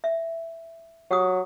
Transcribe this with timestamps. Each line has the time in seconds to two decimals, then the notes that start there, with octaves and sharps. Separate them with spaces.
0.04 E5
1.11 F#3 G4 F#5 D#6